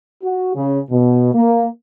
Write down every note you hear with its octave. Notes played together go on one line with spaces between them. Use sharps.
F#4
C#3
B2
A#3